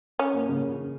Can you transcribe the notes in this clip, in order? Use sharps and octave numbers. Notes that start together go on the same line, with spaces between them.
C#4
A#3
C#3